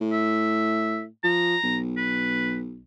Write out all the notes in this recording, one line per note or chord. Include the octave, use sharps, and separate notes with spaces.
A2
E5
F3 A#5
B1
B4